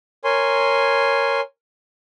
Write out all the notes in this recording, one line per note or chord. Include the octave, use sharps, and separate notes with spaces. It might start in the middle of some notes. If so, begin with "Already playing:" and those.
A#4 C#5 G#5 C6